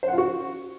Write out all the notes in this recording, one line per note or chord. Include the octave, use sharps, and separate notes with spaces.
C5
F#5
F4
F#4